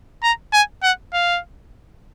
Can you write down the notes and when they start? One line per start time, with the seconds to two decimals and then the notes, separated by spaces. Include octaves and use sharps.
0.23 A#5
0.53 G#5
0.83 F#5
1.13 F5